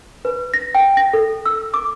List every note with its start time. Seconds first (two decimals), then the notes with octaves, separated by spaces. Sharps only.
0.25 B4
0.54 A#6
0.75 G5
0.97 A#6
1.13 A4
1.46 E6
1.74 D6